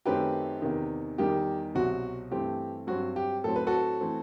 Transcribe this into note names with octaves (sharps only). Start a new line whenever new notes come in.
F#2 D#3 A3 C4 G4 B4
E2 C3 D#3
E2 D#3 G3 G4
C2 B2 F#3 C4 F#4
G2 E3 A3 C4 G4
G2 F#3 C4 F#4
G4
A2 F#3 C4 A4
B4
F#4 A4
E3 A3 C4